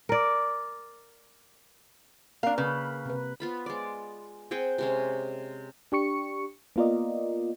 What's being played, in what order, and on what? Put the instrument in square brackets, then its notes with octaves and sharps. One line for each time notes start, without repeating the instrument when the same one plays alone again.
[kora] A#4 D5
[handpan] A#3 A#4 [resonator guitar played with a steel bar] D4 F5
[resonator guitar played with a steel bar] C#3 [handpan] B4
[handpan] C3 B4
[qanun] B3 F4 B5
G#3 D5
C4 G#4 F#5 G5
C3 G#3 C#4
[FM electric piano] D4 G4 C#6 C#7
A#3 B3 F4 A#4 D5 D#5